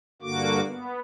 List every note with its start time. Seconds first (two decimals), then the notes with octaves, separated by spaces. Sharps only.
0.22 G2 D3 A#3 F#4 D6
0.65 B3